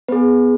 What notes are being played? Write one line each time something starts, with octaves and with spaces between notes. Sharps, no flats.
B3 G#4 B4